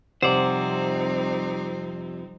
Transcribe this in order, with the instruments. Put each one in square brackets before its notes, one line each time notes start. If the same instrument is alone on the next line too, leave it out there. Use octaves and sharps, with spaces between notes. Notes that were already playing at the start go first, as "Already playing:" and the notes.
[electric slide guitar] F2 F#5 [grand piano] C3 [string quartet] G3 C4 D#4 [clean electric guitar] C5 D5